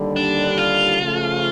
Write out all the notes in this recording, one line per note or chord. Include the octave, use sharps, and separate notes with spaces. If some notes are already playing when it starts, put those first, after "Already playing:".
Already playing: D#2 D3 G3
D4
F4
C#3 F3 A3